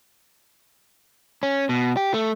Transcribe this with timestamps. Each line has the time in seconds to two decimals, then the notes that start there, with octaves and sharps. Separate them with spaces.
1.43 C#4
1.69 B2
1.97 G4
2.14 A3